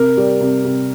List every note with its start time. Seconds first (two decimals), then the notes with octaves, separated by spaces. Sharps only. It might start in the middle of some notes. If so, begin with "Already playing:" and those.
Already playing: C3 A#4
0.17 G3
0.41 C3
0.64 C3